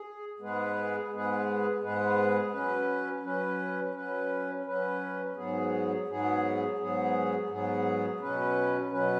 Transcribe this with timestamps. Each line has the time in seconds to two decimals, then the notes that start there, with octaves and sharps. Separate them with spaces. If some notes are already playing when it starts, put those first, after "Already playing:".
Already playing: G#4
0.39 G#2 G#3 B3 G#4 B4
1.10 G#2 G#3 B3 G#4 B4
1.81 G#2 G#3 B3 G#4 B4
2.52 F#3 C#4 B4
3.23 F#3 C#4 B4
3.94 F#3 C#4 B4
4.65 F#3 C#4 B4
5.36 G#2 F#3 B3 G#4
6.07 G#2 F#3 B3 G#4
6.78 G#2 F#3 B3 G#4
7.49 G#2 F#3 B3 G#4
8.20 B2 F#3 C#4 B4
8.91 B2 F#3 C#4 B4